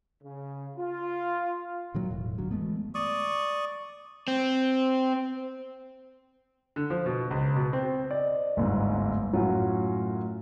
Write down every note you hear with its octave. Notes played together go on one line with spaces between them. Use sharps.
C#3
F4
A#2 D#3 F#3
E1 A2
G1 D3 F#3
E3 G#3 A3 B3
D5 C#6 D#6
C4
D3
F3
B2
C#2
B2
C4
D5 D#5
G1 D2 G#2
F#2 A2 F#3 C#4 F4 F#4